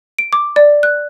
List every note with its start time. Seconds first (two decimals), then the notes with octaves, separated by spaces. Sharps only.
0.19 D7
0.33 D6
0.56 D5
0.83 F#6